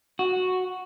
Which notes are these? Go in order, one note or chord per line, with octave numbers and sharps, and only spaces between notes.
F#4